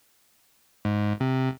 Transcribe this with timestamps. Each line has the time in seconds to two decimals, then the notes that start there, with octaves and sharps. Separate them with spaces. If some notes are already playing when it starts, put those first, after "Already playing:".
0.85 G#2
1.20 C3